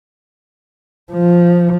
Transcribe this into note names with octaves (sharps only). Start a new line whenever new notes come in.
F3